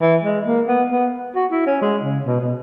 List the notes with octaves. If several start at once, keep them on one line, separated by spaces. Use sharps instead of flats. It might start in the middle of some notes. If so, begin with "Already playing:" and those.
E3
G#3
A#3
B3
B3
F#4
E4
C#4
G#3
C#3
B2
B2